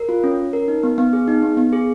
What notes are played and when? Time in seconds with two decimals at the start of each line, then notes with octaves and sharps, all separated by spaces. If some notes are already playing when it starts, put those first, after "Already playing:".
Already playing: A#4
0.09 F4
0.24 C#4
0.38 C#4
0.53 A#4
0.68 D#4
0.83 B3
0.98 B3
1.13 G#4
1.28 D#4
1.43 B3
1.57 B3
1.73 G#4